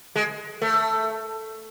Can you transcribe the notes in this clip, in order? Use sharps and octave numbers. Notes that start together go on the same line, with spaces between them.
G#3
A3